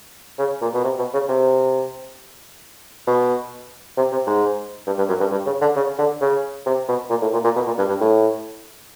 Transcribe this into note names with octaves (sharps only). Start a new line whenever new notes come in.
C#3
A#2
B2
C3
B2
C#3
C3
B2
C3
C3
G#2
G2
G2
F#2
G2
G2
C#3
D3
C#3
D3
C#3
C3
B2
A#2
A2
A#2
A#2
B2
A#2
G2
G2
A2